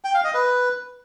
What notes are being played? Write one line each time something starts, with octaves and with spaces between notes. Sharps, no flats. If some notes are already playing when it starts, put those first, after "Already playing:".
G5
F5
D#5
B4